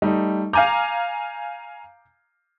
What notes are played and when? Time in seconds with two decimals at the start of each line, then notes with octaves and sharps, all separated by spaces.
0.02 G3 A3 D#4
0.53 F5 G#5 A#5 D6 G6